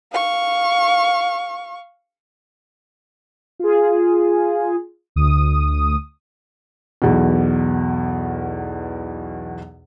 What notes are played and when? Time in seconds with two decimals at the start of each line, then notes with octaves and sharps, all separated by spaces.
0.12 F5 C#6
3.59 F4 G#4
5.16 D2 D#6
7.02 B1 E2 B2